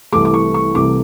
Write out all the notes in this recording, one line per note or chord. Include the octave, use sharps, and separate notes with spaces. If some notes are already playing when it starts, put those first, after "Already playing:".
C2 C3 E3 A3 D6
D6
C#6
C#6
C2 C3 E3 A3 D6